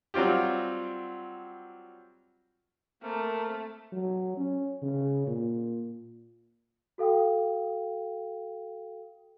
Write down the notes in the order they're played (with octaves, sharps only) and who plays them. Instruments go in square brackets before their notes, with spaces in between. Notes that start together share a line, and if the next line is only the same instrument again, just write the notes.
[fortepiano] F#3 G3 C4 F4 G4
[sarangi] A3 [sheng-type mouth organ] A#3 C4 A#4
[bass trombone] F#3
C#4
C#3
A#2
[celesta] F#4 A4 F5 G5 D#6